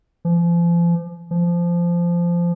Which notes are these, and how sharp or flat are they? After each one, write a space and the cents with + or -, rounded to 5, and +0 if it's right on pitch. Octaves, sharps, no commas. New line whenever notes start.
F3 -35
F3 -15